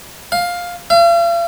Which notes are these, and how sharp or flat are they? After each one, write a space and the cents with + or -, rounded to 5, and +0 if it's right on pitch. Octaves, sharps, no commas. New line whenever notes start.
F5 +10
F5 -45